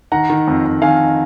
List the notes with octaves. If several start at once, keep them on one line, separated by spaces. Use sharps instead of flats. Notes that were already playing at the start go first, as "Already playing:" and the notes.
D#3 F#5 A#5
D#3
F2
F2
D#3 F5 G#5
D#3